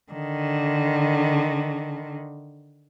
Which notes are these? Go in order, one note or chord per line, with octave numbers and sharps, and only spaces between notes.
D3 D#3